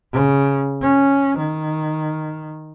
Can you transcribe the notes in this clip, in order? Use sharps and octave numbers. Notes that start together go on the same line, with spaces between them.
C#3
C#4
D#3